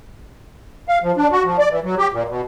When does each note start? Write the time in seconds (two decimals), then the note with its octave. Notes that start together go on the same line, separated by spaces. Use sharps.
0.88 F5
1.03 F3
1.17 D4
1.32 F#4
1.44 F3
1.58 D5
1.70 E3
1.84 F#3
1.98 G4
2.12 A#2
2.28 B2